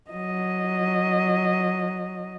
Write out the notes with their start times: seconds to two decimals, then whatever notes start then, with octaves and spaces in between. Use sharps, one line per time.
0.11 F#3 D#5